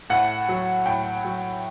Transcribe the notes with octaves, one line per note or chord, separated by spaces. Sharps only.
A2 F#5
F#3
A2 G5
F#3